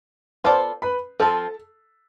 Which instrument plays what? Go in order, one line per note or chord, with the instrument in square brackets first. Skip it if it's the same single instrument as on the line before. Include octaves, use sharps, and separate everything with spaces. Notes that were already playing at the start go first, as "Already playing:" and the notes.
[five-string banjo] B3 F4 A4 D5 [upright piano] C5 C6
[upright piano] B4 B5
[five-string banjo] F3 C4 F4 [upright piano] A4 A5